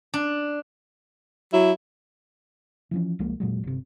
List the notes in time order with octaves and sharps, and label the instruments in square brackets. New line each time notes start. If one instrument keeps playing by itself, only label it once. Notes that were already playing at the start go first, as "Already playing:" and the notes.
[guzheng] D4
[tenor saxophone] F#3 [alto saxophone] E4
[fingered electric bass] E3 F3 C#4
C2 F3 G#3 A#3
E1 A#2 F#3 G#3
G1 C3